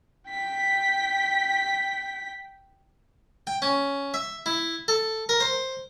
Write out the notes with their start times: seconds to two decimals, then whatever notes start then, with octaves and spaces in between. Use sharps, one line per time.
0.30 G5 B6
3.47 G5
3.62 C#4
4.14 E5
4.46 E4
4.88 A4
5.29 A#4
5.40 C5